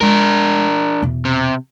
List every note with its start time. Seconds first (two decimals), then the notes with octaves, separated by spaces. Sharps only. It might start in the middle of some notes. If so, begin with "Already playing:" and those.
0.01 G#3 D4 A#4
1.02 E2 B2
1.25 C3